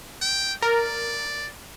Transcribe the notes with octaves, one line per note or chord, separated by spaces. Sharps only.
G5
A#4 D5